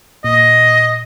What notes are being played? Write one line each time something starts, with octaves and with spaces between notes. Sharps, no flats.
A#2 D#5